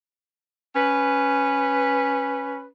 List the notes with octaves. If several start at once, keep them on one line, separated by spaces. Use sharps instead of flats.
C#4 B4